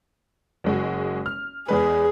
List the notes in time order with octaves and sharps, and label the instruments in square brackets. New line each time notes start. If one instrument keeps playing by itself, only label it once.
[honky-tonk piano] F#1 G#3 F#4
F6
[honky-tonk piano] E2 G#3 B4 [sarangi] G#4